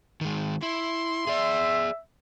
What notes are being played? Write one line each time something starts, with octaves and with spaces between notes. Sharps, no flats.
D#3 G#3
E4 C6
G#4 D5 E5